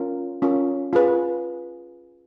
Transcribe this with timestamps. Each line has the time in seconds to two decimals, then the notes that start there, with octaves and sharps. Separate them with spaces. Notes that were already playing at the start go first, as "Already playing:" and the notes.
Already playing: C#4 F4 A#4
0.42 C#4 F4 A#4
0.93 F4 G#4 B4